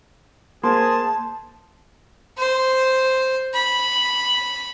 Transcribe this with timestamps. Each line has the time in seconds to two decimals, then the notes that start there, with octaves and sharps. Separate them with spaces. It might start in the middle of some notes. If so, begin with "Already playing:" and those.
0.63 A#3 G#4 C5 A5
2.38 C5
3.54 B5